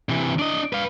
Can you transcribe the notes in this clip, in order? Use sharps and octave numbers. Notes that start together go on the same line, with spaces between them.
C3 E3
D4 D#5
B4 F5